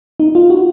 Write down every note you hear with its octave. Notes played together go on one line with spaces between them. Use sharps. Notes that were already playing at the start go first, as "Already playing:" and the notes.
D#4
F4
F#4